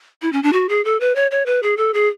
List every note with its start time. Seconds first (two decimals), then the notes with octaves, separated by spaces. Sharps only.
0.22 E4
0.33 C#4
0.43 D4
0.53 F#4
0.69 G#4
0.85 A4
1.00 B4
1.16 C#5
1.31 C#5
1.46 B4
1.63 G#4
1.77 A4
1.94 G#4